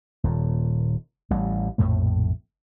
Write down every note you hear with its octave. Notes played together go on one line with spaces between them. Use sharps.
D#1 A#2
A1 A2 G3
A#1 F2 A2 A3